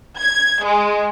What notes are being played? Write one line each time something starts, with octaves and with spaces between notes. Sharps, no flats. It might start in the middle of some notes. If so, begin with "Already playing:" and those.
G#6
G#3